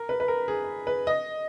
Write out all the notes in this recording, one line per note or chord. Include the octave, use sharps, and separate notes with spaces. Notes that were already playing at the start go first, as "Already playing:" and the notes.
Already playing: A#4
B4
B4
A#4
G#4
B4
D#5